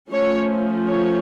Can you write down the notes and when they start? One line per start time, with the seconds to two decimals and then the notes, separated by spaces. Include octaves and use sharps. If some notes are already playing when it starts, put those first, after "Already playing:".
0.11 F3 A3 C#4 C#5
0.87 C#5